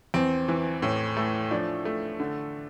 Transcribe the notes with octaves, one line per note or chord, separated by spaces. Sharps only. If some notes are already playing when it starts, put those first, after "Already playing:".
E2 C4
E3
A2
A3
F3 D4
A3
D3